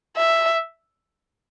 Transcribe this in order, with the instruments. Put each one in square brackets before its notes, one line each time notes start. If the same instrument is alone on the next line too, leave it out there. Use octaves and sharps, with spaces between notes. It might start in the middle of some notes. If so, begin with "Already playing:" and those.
[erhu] E5